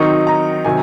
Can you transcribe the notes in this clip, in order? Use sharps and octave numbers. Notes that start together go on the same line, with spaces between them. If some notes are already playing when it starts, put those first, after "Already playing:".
Already playing: D#3 F#3 C4 D#4 C#6
A#5
C3 D#3 F#3 G#5